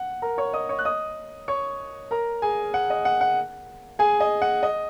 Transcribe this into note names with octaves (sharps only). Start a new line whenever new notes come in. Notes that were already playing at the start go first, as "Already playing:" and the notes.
Already playing: F#5
A#4 A#5
C#5 C#6
D#5 D#6
C#5 C#6
F#6
D#5 D#6
C#5 C#6
A#4 A#5
G#4 G#5
F#5
D#5
F#5
F#5
G#4 G#5
D#5
F#5
D#5